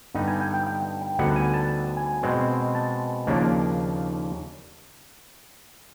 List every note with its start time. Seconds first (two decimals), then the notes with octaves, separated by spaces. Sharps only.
0.15 G2 D3 G3 B3 D#4
0.28 G#5
0.41 G5
0.54 G5
0.67 G5
1.01 G5
1.19 D2 D3 G3 B3 D#4 F#5
1.36 G#5
1.54 A5
1.97 G#5
2.23 B2 G#3 C4
2.75 A5
3.27 D#2 C#3 F3 A#3 D4